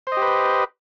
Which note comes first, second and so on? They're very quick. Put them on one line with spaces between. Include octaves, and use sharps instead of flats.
C5 D#5 G4 B4